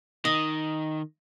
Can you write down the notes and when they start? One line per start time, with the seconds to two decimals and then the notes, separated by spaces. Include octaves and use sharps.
0.25 D#3 D#5